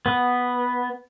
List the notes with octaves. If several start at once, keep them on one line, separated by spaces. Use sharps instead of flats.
B3